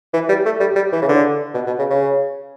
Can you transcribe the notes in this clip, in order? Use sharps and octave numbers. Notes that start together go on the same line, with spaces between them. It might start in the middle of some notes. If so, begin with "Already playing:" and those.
E3
G3
A3
G3
G3
E3
C#3
D3
B2
B2
C#3
C#3